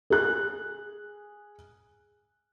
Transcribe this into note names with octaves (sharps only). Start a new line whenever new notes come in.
G#4 F#6